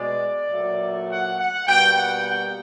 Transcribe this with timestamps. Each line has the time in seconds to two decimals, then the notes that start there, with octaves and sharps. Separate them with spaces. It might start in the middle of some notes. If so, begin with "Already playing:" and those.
Already playing: B2 G#3 D5
0.51 A#2 F#3 A3
1.09 F#5
1.38 F#5
1.67 B2 G3 A#3 G5
1.95 F#5
2.25 G5